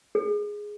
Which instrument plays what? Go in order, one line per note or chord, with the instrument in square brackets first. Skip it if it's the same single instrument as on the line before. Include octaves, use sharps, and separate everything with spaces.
[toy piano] G#4